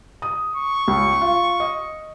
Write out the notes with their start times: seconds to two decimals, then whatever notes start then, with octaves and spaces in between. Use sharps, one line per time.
0.22 D#6
0.56 C#6
0.88 C#2
1.21 F4
1.60 D#5